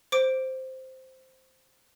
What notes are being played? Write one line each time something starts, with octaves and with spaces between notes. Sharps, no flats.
C5 D6 D7